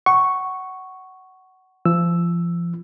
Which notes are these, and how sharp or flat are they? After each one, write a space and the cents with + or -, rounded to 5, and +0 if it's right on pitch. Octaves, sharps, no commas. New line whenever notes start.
F#5 +20 C#6 +0
F3 -30 E6 +0